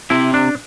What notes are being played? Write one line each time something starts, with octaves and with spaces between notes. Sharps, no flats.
C4 E4 G4
D4